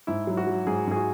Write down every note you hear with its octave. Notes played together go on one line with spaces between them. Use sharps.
G#2 E4
F#3
F#4
F#3
G#2 G#4
G#2 G#4
F#4